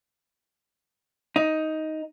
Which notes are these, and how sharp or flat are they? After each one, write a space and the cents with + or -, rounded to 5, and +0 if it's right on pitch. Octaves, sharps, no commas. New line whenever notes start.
D#4 +10